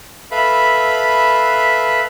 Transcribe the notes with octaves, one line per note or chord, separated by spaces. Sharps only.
A4 B4 E5 F5 B5